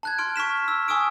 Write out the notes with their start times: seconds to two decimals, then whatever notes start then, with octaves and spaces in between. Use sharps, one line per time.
0.03 A5 F#6 G#6
0.18 C6 F6 D7
0.36 C#6 F6 B6 E7
0.68 E6
0.88 G#5 C#6 D#6 E6 D7